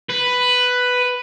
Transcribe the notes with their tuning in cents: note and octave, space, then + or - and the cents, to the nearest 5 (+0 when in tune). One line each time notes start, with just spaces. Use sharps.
B4 +5